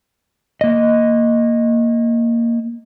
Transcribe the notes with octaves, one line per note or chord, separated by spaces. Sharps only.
A#3 D#5